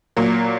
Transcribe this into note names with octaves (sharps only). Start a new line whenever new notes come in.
A#2 F#3 A#3